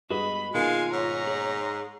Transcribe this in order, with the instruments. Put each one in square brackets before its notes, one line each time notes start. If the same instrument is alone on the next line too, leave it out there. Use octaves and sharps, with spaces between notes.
[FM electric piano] G2 G#3 B3 [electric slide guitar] F#4 G#4 D#5 [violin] B5
[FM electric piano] B2 D#3 A#3 [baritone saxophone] G#3 [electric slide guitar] F4 [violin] F5 G#5
[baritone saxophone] G#2 [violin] C#5 A#5
[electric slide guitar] G#4